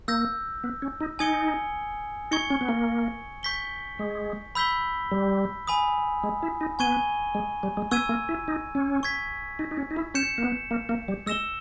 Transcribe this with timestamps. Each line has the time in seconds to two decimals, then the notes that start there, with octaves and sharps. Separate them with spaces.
0.08 A#3 E6 G6 A#6
0.64 B3
0.82 C#4
1.01 D#4
1.19 D#4 G#5 D#6 G#6 C#7 G7
2.31 D#4 C#6 G#6 C#7 G7
2.50 C#4
2.61 B3
2.69 A#3
3.43 C#6 G6 B6 G7
3.99 G#3
4.55 B5 E6 G6 B6 G7
5.12 G3
5.67 G#5 B5 D#6
6.23 G#3
6.43 E4
6.61 D#4
6.79 B3 G#5 C#6 G#6 D#7 G7
7.35 G#3
7.63 G3
7.77 G#3
7.91 B3 C#6 E6 G#6 D#7
8.09 A#3
8.29 E4
8.48 D#4
8.75 C#4
9.03 C#6 G#6 B6
9.59 D#4
9.71 D#4
9.77 C#4
9.91 D#4
9.96 E4
10.14 C#4 G6 C#7 E7
10.38 A#3
10.44 B3
10.71 A#3
10.89 A#3
11.08 G3
11.26 G#3 E6 A#6 E7 G7